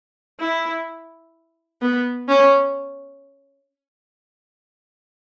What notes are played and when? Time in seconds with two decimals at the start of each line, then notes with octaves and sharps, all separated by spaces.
0.40 E4
1.82 B3
2.29 C#4